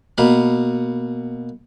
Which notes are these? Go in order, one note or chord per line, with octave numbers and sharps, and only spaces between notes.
B2 A#3 B5